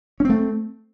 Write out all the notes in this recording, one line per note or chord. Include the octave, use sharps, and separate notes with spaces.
A3 C4 C#4